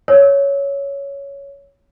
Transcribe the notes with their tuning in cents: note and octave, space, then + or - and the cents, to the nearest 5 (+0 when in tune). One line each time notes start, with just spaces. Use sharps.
C#5 +10 E6 -25